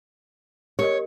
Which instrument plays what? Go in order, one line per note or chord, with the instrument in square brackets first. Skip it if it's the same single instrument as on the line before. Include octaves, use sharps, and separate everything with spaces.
[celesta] G4 A#4 D#5 [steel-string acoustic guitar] C#5